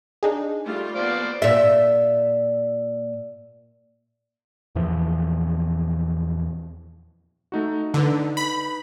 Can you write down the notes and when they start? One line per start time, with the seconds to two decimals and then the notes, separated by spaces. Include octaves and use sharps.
0.23 D4 D#4 G#4
0.63 G3 A3 F4
0.95 A#3 B3 C5 D5 F5
1.42 A#2 E5
4.75 E2 A#2 E3 F3
7.52 A3 D#4 F#4
7.94 D3 D#4 B4
8.37 B5